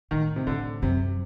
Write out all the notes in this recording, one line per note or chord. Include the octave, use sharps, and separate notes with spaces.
A2 D#3
C3
A2 D3
F#2 C3